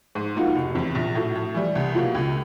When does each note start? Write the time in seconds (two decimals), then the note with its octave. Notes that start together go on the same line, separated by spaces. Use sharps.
0.15 G#2
0.36 F3 A#3 D#4 F#4
0.55 F1
0.75 E2 C3
0.95 A#1
1.15 A2 F#3
1.35 A2
1.55 E3 G3
1.75 C2
1.95 B2 F#3 A#3
2.15 C#2